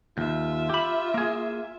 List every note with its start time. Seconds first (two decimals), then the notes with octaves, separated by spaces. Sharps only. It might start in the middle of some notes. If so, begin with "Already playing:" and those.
0.18 D#2 F4 E5
0.70 G4 B5
1.14 A#3 G#4